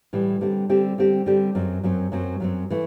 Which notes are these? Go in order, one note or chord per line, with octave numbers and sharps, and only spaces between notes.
A2 E3 G3
D3 G3 C4 G4
D3 G3 C4 G4
D3 G3 C4 G4
D3 G3 C4 G4
F#2 F#3 C4
F#2 F#3 C4
F#2 F#3 C4
F#2 F#3 C4
E3 A3